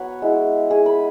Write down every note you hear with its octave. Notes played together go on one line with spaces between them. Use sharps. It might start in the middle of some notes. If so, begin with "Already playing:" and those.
Already playing: F#3 B3 B4 C#5 F#5
G#3 E4
G#4
B5